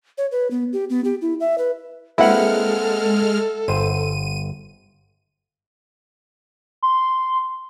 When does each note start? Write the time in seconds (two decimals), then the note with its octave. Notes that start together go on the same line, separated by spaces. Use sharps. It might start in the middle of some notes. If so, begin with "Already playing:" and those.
0.18 C#5
0.32 B4
0.51 B3
0.73 G4
0.90 B3
1.04 G4
1.22 E4
1.40 E5
1.58 B4
2.18 G#3 A#3 C4 E4 A4 B4 F#5 F6
3.68 G1 C5 D#7
6.83 C6